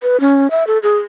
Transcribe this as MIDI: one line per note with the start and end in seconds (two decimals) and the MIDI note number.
0.03 0.20 71
0.20 0.51 61
0.51 0.66 76
0.67 0.78 69
0.83 0.97 68